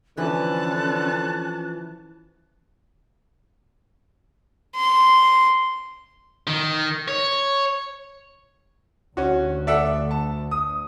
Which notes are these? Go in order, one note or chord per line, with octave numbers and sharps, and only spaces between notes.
D3 E3 F3 C#4 B4 A5 F#6
C6
D#3
C#5
D2 C#4 F#4
A4 D5 E5 F#5
A5
D#6